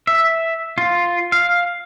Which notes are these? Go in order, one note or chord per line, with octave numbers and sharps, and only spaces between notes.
E5
F4
F5